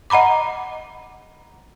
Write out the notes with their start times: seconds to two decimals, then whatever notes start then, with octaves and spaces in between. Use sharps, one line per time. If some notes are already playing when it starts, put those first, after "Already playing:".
0.10 D#5 F#5 A#5 B5 D6